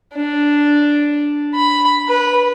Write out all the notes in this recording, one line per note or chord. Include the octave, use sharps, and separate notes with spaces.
D4
B5
B4